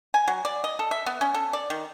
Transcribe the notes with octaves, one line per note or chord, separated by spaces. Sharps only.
G#5
F#3
D5
D#5
A4
E5
B3
C#4
A4
D5
D#3